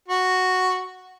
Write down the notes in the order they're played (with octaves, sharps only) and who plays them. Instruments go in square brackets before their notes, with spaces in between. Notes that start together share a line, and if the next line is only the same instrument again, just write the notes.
[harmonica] F#4